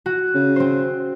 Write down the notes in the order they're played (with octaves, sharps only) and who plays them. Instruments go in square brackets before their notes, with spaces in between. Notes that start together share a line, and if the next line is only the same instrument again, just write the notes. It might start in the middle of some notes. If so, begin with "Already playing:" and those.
[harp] F#4
[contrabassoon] C#3
[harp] C4 C5